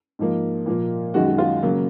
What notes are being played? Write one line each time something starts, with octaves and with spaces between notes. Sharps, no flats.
G#2 F3 A#3
A#2 F3 A#3
F#2 D#3 G#3 F#4
F#4
F4
C#3 F#3 A#3